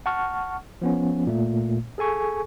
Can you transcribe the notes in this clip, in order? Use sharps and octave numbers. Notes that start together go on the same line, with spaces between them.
F#5 A5 C#6 F6
F3 B3 C#4
A#2 A3
G#4 A4 G#5 C#6